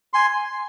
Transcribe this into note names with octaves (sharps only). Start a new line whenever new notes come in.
G#5 C6